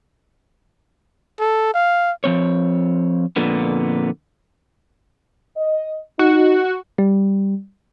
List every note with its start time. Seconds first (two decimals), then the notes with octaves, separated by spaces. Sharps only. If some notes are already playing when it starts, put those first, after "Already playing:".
1.39 A4
1.74 F5
2.24 F3 C4 C#5
3.36 F2 A#2 D3 B3
5.57 D#5
6.19 D#4 F#4
6.98 G3